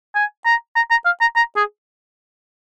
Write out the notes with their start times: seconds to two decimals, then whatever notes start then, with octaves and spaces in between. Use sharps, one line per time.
0.15 G#5
0.46 A#5
0.76 A#5
0.91 A#5
1.06 F5
1.21 A#5
1.36 A#5
1.57 G#4